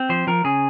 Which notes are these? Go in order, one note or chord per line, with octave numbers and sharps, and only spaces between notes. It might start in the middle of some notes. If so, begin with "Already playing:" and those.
Already playing: C4
F3 C5
F3 A#4
C#3 G#4